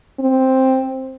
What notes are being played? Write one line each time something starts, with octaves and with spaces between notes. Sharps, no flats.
C4